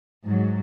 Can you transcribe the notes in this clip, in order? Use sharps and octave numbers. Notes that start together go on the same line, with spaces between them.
G#2 F#3